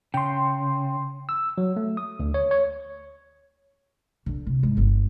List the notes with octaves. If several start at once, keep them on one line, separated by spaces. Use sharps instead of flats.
C#3 G5 C6
E6
F#3
A3
D#6
D2
C#5
C#5
A#1 D3
C2
G#2
G1 B3